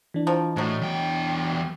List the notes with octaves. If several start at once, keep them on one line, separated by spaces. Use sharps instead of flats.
E3 D4
D#3 F3
A2 F#3 G#3
E2 G5